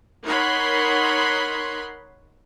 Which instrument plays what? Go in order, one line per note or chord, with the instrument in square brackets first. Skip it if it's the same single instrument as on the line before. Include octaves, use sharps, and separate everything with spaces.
[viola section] D#4 A#4 C#5 F#5 B5 C6